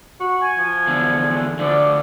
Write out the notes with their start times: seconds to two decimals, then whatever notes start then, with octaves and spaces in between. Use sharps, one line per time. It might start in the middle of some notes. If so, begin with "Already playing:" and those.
0.21 F#4
0.41 G#5
0.58 F3
0.87 E2 D3
1.59 D2 D3 F3 D5